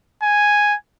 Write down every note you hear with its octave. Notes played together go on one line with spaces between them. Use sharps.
G#5